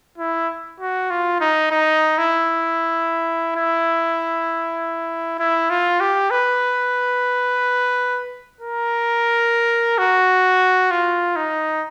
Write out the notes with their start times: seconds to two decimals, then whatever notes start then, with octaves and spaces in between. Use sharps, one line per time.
0.18 E4
0.80 F#4
1.10 F4
1.41 D#4
1.71 D#4
2.18 E4
3.56 E4
5.39 E4
5.70 F4
6.01 G4
6.31 B4
8.61 A#4
9.98 F#4
10.91 F4
11.36 D#4